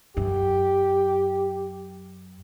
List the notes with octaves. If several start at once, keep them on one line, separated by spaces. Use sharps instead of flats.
F#2 G4